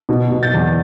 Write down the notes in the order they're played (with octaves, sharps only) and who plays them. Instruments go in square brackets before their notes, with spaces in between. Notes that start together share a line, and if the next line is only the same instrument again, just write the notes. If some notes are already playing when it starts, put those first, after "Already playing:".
[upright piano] B2
B2
G6 A6
E2